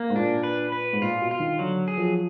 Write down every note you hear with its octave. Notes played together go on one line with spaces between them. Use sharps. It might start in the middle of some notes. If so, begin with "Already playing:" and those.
Already playing: A#3
G#2
A#2 D4
B4
B4
G#2
A#2 F4
B2
F4
D#3
D3 F#3
G#4
F3